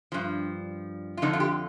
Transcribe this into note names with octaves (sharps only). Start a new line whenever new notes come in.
G2 F3
F4
F2 D3 F3 D#4
F4
G4